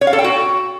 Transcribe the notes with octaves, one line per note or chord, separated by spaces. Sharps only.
C#5
F5
A4
G5
F#4